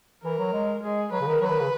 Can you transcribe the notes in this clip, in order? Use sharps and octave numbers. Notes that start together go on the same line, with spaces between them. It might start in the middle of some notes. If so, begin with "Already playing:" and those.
E3 A#4
F#3
G#3
G#3 G#4
F#3 B4
C#3
D#3
F#3 B4
D#3
C#3